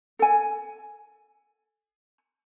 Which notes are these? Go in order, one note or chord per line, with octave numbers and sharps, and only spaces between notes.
A4 G#5